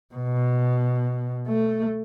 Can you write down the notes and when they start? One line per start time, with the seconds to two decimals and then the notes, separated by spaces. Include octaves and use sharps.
0.15 B2
1.48 A3